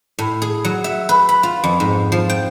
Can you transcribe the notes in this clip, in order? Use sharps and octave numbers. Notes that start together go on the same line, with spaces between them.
A2
G#4
F#3
E5
B4
B5
F4
F2
G#2
F3
G5